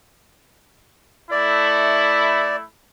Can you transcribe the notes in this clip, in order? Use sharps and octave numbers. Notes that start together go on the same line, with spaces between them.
A3 E4 D5